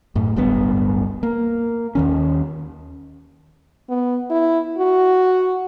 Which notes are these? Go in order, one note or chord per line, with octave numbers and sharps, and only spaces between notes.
F#2 A2
D1 G1 G2 B3
A#3
D#2 D#3 C#4
B3
E4
F#4